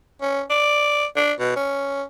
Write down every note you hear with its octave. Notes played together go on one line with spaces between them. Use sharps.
C#4
D5
D4
B2
C#4